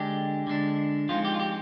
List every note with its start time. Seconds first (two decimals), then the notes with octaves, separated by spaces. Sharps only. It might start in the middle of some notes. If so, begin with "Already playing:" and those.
Already playing: D3 G#3 D4 G4
0.47 D3 G#3 D4
1.09 F3 G#3 C4 D#4 F4
1.25 G4
1.34 F4
1.40 G4